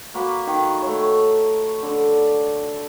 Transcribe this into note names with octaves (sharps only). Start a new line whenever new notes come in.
A#3 F#4 B4
D#3
A3 C#5
D3